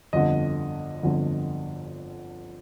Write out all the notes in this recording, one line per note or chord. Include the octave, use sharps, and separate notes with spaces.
G1 F2 D3 D#5
G1 F2 D3